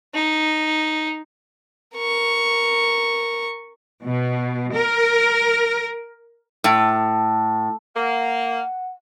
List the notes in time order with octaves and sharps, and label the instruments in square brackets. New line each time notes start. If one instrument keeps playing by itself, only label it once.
[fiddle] D#4
[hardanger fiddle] A#4 C#6
[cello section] B2
A#4
[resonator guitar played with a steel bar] A2
[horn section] A#3 [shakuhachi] F#5